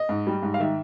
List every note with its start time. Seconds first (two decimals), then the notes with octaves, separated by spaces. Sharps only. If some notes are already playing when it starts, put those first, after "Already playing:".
Already playing: D#5
0.09 G#2
0.27 G3
0.43 G#2
0.54 F5
0.60 D#3 E5